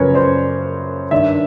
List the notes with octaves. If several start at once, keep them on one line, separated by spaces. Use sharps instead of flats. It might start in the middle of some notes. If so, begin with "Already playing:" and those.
Already playing: F#2 C#3 F3 A#4 B4 C#5
C5 D5
G2 D#3 D5 E5